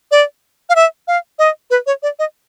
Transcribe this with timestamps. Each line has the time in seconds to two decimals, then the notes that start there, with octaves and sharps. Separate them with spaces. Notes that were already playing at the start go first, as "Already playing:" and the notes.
0.11 D5
0.69 F5
0.76 E5
1.08 F5
1.39 D#5
1.71 B4
1.86 C#5
2.03 D5
2.19 D#5